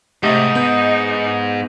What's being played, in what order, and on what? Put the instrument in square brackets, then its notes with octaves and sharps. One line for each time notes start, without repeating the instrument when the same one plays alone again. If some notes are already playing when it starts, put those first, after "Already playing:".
[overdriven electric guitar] G#2 [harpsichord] C3 A3 [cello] D#4 [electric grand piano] G4
[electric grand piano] B3 G6 [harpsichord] B5